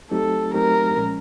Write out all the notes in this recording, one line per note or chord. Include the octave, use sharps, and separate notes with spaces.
F#3 A3 C4 D#4 G4 A4
F#3 A3 C4 D#4 G4 A#4
A#2 F3 G#3 C#4